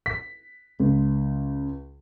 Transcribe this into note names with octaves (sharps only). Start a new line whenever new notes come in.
B6
C#2